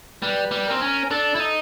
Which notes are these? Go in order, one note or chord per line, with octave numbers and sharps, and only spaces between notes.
G3 B4
G3
C4 A#4
C#4
D4 A4
E4
D#4